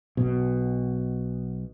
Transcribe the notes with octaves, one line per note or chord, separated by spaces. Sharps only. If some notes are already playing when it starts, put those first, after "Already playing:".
B1 B2